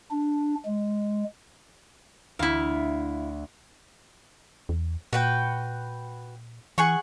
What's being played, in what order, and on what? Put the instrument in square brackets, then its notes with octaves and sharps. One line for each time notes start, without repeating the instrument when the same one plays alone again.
[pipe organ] D4
G#3
[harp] D2 [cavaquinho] E4 F5
[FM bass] E2
[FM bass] A#2 [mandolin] F#4 B4 G5
[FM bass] E3 [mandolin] G#4 F#5 C#6